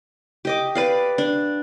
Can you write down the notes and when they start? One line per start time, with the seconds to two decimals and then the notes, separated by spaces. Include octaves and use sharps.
0.45 G4 D#5 D6
0.75 B4 D5 F5
1.18 D4